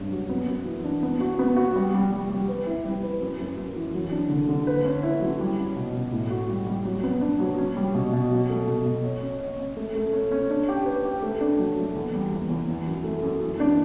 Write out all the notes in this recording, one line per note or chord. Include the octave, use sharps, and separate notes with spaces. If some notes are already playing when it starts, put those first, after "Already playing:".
Already playing: G2 C#4
F#3
B3
F#2
E3
D4
B3
F#4
B3
F#4
G3
G3
G3
G3
B4
E4
G3
B4
F#2
F#2
F#2
E3
F#3
D4
D3
D3
B4
C#4
E4
F#3
G3
C#4
B2
B2
A2
F#4
G3
G3
F#3
B3
D4
F#3
C#4
G3
B2
B2
F#3
A3
B2
B2
C#5
C#4
C#5
C#4
A3
A3
C#4
C#4
D4
G4
B4
G4
A3
D4
F#3
A3
E2
G3
E2
E2
E3
F#2
A3
F#2
E3
D4